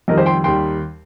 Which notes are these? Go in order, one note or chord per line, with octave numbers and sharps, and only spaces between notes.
F2 D#3 G3 A#4 D#5
G4 C5
G5 C6
D#2 D#3 G3 G5 C6